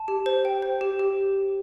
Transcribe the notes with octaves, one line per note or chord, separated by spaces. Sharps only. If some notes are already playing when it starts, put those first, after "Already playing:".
Already playing: A5
G4
C5
G5
C5
G4
G4